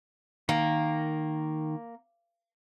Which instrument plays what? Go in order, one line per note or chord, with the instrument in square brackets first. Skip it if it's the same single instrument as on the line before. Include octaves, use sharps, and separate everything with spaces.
[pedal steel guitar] D#3 [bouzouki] A#3